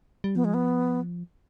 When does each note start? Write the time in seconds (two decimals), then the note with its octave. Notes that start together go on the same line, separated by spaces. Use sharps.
0.24 G3
0.35 F3 B3
0.45 G#3
0.54 B3